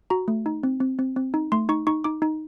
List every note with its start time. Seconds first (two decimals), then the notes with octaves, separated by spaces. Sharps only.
0.10 F#4 A#5
0.28 A3
0.46 D#4
0.63 C4
0.80 C4
0.99 C4
1.16 C4
1.34 D#4
1.52 A3 C6
1.69 D#4 C#6
1.87 D#4 C#6
2.04 D#4 D6
2.22 D#4